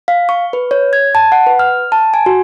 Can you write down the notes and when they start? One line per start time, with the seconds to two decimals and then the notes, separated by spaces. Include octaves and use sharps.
0.08 F5
0.29 C#6
0.53 B4
0.71 C#5
0.93 G#6
1.15 A5
1.32 F#5
1.47 B4
1.59 F6
1.92 A5
2.14 G#5
2.26 F#4